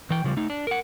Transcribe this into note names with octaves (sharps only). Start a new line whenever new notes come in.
E3 G5
C#3 F3 G3
A3 D#4
D4
A#4 F#5